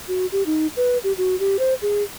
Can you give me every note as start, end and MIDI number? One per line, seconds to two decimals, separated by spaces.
0.08 0.26 66
0.32 0.43 67
0.46 0.67 63
0.77 0.98 71
1.04 1.13 67
1.18 1.38 66
1.40 1.57 67
1.59 1.74 72
1.82 2.03 68